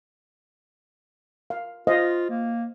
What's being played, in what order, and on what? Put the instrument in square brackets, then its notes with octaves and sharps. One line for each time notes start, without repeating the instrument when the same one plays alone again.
[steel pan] F5
[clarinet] F4 [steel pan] C5 D#5 F5
[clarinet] A#3